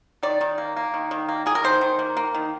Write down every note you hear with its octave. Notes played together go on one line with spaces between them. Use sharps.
D#3 D5
D#3
A#3
A#3
D#3
D#3
A#3
A#3 G#4
A#4
D#3 C5
D#3
A#3
A#3
D#3